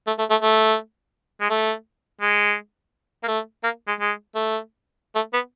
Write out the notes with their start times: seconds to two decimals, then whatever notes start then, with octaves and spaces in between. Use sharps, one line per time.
0.07 A3
0.19 A3
0.30 A3
0.42 A3
1.41 G#3
1.50 A3
2.21 G#3
3.23 A#3
3.28 A3
3.64 A#3
3.88 G#3
4.00 G#3
4.35 A3
5.15 A3
5.33 B3